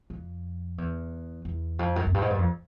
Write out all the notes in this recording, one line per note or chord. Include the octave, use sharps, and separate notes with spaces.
F2
E2
E2
F2
F#2
F#2
G2
G#2
G2
F2